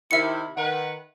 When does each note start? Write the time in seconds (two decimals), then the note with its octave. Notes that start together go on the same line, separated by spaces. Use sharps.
0.11 C3 D#3 E4 E5 C#7
0.56 D#3 B4 F#5